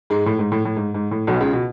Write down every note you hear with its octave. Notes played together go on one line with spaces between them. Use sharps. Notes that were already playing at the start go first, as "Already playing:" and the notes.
G#2 G#3
A2
G#2
A2
A2
G#2
G#2
A2
B1 B2
C#2 C#3
B2